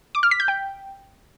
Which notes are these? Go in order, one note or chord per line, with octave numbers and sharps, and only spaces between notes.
D6
F6
B6
G6
G5